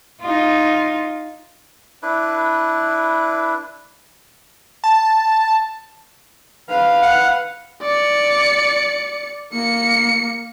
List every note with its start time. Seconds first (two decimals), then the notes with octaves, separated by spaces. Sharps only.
0.22 D#4 F4
2.03 D4 E4 B4
4.84 A5
6.69 B4 F5
7.02 F#5
7.83 D5 C#7
9.53 A#3 C#7